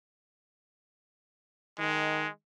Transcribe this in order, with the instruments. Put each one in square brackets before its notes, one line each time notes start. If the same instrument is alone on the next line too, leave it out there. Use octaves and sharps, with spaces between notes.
[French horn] D#3 [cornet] G#3